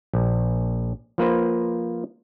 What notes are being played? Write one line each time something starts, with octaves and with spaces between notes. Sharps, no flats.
A#1
F3 A#3 B4 C5